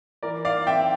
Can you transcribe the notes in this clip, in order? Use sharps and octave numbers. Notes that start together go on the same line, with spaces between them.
E3 A#4 D5
D5 F5
C4 E5 G5